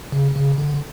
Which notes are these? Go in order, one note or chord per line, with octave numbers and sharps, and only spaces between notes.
C#3
C#3
D3